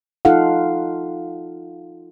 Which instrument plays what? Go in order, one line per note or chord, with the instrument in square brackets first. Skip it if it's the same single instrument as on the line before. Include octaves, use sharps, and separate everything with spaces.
[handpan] D#4 F4 A4 F5 F#5